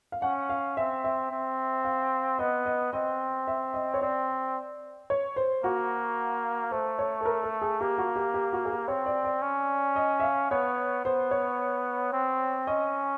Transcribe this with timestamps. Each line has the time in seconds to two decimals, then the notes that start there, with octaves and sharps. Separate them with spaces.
0.12 F5
0.22 C#4 F#5
0.49 F5
0.77 C4 E5
1.04 E5
1.31 C4
1.85 F5
2.39 B3 D#5
2.66 D#5
2.93 C4 D#5
3.47 E5
3.74 D#5
3.94 C#5
4.02 C4 D5
5.10 C#5
5.36 C5
5.64 A#3 F#4
6.71 A3 C5
6.99 C#5
7.21 A4
7.25 A#4
7.44 A4
7.62 G#4
7.81 A#3 G4
7.98 F#4
8.16 G4
8.34 G4
8.53 F#4
8.65 G#4
8.71 G4
8.88 C4 C#5
9.06 D5
9.25 D5
9.42 C#4
9.96 D#5
10.20 E5
10.23 F5
10.51 B3 C#5
11.05 B3 C5
11.31 C#5
12.12 C4
12.67 C#4 D#5